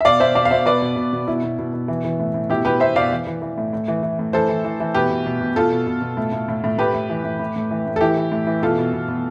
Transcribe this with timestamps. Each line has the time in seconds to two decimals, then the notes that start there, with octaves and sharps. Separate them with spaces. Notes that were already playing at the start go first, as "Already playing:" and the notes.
0.01 E5
0.05 B2 D5 F5
0.20 B2 C5 E5
0.35 B2 D5 F5
0.45 F5
0.51 B2 C5 E5
0.66 B2 B4 D5
0.82 B2
0.96 B2
1.13 B2
1.28 B2 E4
1.43 B2
1.59 B2
1.73 B2
1.88 E3
2.05 E3
2.19 A2
2.34 A2
2.50 B2 E4 G4
2.65 B2 G4 B4
2.80 B2 C5 E5
2.96 B2 D5 F5
3.11 E3
3.27 E3
3.42 E3
3.58 A2
3.73 A2
3.88 E3
4.03 E3
4.19 A2
4.33 E3 A4 C5
4.49 E3
4.65 E3
4.80 E3
4.94 B2 G4 B4
5.10 B2
5.26 B2
5.41 B2
5.56 B2 F4 A4
5.72 B2
5.87 B2
6.02 B2
6.17 A2
6.32 A2
6.48 A2
6.64 A2
6.78 A2 G4 B4
6.94 A2
7.10 E3
7.24 A2
7.39 A2
7.56 A2
7.71 E3
7.87 A2
7.96 A4
8.01 E3 E4 G4
8.17 E3
8.32 A2
8.47 E3
8.63 B2 F4 A4
8.78 B2
8.93 B2
9.08 B2